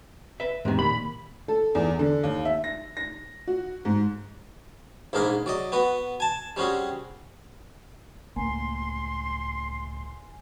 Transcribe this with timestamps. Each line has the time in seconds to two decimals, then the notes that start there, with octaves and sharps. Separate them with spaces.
0.40 B4 E5
0.65 E2 G#2 D#3 C4 G4
0.79 A#2 D#3 A#3 B5
1.48 A4
1.75 E2
1.99 D3
2.23 D#2
2.45 E5
2.64 A#6
2.97 A#6
3.47 F#4
3.85 G#2
5.13 A#1 G#2 A#3 G#4 A#4 B5
5.46 F#3 D5 D#5
5.72 B3 F#4 B4
6.20 G#5 A5
6.57 G3 C4 C#4 F#4 G#4
8.36 C#2 A2 A#3 G#5 C6